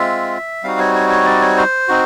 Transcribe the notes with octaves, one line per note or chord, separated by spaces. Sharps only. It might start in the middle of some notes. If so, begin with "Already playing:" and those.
Already playing: G#3 C4 F4 E5
G3 C4 D#4 F#4 F5
C#5
C#5
C#5
D5
C#5
C5
C4 D#4 F#4